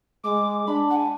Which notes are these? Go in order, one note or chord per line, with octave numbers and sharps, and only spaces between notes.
G#3 D6
D4 B5
F#5
G#5